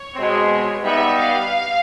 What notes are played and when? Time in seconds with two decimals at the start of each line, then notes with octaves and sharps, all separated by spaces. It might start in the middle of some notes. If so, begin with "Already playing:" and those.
Already playing: C#5
0.15 B2 G#3 C4
0.84 G3 B3 D#4 E5
1.18 F5